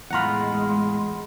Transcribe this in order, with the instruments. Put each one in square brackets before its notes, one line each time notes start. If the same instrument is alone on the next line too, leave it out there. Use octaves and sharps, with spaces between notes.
[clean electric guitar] E2 A2 F4 [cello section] G#3 [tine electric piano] F#5 A#5 B5